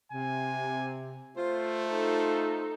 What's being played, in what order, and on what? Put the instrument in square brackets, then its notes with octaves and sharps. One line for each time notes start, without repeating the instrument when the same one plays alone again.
[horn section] C3 [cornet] G#5
[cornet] A3 [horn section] F4 C5
[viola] D#4 A4